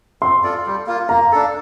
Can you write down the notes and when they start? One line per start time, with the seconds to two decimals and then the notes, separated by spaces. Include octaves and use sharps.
0.22 C4 C6
0.43 F4 A4 D5
0.66 G3
0.87 A#3 F4
1.09 A#3 A#5
1.32 D4 A4